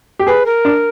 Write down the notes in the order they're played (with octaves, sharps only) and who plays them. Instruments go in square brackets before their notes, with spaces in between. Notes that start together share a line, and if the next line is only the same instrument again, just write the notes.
[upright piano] G4
[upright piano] G#4 [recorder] B4
[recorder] A#4
[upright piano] D4